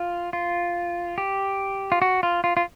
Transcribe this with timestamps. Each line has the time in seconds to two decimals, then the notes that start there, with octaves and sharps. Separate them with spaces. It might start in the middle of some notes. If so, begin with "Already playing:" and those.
Already playing: F4
0.33 F4
1.18 G4
1.92 F4
2.02 F#4
2.23 F4
2.44 F4
2.57 F4